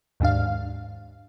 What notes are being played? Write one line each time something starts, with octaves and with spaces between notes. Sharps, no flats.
D#2 G#2 D4 F5